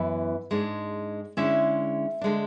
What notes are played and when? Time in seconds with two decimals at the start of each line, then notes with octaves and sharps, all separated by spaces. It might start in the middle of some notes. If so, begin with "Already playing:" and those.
Already playing: F#2 E3 B3 E4
0.51 G#2 G#3 D4
1.37 D3 G#3 C#4 E4 E5
2.21 D3 G#3 D4